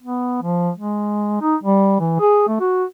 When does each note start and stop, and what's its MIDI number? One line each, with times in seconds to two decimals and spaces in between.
0.03 0.39 59
0.42 0.70 53
0.76 1.37 56
1.42 1.56 63
1.63 1.97 55
2.00 2.19 52
2.20 2.44 68
2.48 2.58 57
2.60 2.84 66